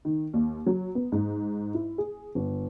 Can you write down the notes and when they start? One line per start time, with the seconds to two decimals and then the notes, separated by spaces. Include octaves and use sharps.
0.05 D#3
0.33 D#2
0.66 F#3
0.95 B3
1.12 G#2
1.74 E4
1.98 G#4
2.35 G1